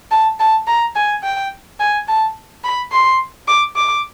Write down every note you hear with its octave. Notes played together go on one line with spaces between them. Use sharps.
A5
A5
A#5
G#5
G5
G#5
A5
B5
C6
D6
D6